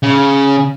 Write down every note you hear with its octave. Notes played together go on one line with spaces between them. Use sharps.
C#3